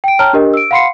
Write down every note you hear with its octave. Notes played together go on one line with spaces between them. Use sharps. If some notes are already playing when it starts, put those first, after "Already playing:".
G5 D7
C#5 G5 A5 A#5 F6
D4 G4 A#4 D#5
E6 D7
F5 F#5 B5 C6 C7 C#7